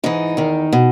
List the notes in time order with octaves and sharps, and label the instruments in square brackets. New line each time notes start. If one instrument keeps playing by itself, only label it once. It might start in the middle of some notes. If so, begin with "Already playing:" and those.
[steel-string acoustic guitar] G#2 E3 D#4
E2 D#3
B2